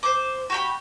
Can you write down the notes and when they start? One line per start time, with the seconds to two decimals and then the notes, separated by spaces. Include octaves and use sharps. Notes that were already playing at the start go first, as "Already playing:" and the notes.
0.03 C5 D6
0.50 F#4 G4 B5